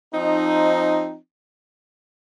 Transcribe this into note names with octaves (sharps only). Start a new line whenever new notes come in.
F3 C4 D#4